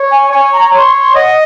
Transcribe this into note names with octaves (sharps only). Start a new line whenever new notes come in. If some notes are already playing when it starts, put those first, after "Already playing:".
Already playing: C#5
G#5
C#5 G#5
A#5
C#5 C6
C6
D#5 F#5